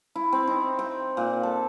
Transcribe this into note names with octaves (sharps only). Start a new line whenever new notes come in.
E4
C4
D#4
G5
A#2
A4